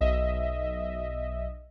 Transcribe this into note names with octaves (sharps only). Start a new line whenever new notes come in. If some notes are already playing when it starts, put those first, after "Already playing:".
B1 D#5 E5